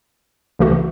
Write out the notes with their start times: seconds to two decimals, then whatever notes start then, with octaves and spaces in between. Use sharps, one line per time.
0.59 C#2 C#3 E3 A3 F#4